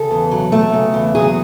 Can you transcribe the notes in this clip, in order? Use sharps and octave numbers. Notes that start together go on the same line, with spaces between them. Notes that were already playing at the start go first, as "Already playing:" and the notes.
Already playing: C#3 A4
E2
F#3
A3
C#3
E2
F#3 G#4